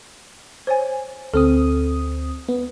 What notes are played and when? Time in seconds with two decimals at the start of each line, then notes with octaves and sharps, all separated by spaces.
0.67 C5 C#5 G#5
1.34 D2 C4 A4 D#6
2.49 B3